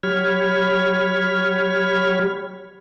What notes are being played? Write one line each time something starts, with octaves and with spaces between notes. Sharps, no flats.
F#3 G4 C#5 B5 F6 G#6